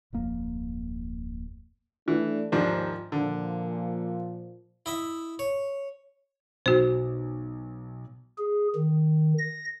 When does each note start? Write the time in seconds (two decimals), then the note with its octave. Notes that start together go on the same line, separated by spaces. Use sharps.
0.13 D1 F2 A#3
2.08 E3 A3 D4
2.52 D#2 G#2 F3 D4 G4 A#4
3.12 A#2 D3 F3
4.86 E4 D#5 E5
5.39 C#5
6.66 B1 F#4 C5
8.38 G#4
8.75 D#3
9.38 A#6